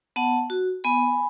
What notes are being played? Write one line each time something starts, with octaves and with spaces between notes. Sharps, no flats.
B3 F#5 A5
F#4
B3 G#5 B5